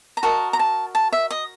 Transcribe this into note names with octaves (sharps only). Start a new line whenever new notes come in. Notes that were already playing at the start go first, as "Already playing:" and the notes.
A#5
F#4 A#4 D#5 A5
A#5
A5
A5
E5
D#5